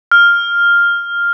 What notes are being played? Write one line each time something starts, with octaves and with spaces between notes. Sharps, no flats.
F6